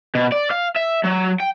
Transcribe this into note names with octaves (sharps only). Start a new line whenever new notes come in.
B2
D5
F5
E5
F#3
G5